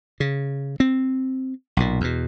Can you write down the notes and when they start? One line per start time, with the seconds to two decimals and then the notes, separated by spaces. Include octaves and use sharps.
0.20 C#3
0.80 C4
1.77 B1 A#2
2.01 E2 B2